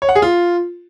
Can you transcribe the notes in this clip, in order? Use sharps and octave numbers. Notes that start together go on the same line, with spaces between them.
C#5
F#5
G#4
F4